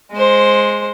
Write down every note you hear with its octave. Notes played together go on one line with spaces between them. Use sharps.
G#3 C5